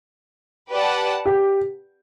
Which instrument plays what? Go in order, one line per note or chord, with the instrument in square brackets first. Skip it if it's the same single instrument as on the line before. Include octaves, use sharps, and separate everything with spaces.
[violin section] G4 B4 D5 F#5 A5
[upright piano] G4